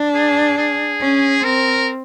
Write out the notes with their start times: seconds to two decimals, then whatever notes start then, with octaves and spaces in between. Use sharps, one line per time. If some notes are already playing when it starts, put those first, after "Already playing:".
Already playing: D4
0.15 G#4
0.58 G#4
1.01 C#4
1.44 C4 A#4